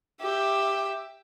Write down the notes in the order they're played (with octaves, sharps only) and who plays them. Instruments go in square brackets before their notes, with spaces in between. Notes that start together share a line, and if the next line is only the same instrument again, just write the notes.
[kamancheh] G4 E5